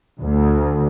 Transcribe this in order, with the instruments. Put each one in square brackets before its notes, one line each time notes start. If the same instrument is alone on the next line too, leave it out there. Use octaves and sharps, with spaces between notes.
[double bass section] D2